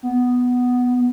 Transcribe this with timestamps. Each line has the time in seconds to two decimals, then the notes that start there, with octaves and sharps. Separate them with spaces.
0.03 B3